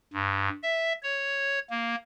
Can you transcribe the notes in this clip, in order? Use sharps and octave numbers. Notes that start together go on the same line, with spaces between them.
G2
E5
C#5
A#3